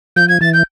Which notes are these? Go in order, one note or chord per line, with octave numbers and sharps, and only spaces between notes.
F3 G6
G#6
E3 A6
G6